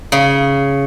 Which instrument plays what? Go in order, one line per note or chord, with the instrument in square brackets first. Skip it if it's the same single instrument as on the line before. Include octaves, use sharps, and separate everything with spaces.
[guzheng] C#3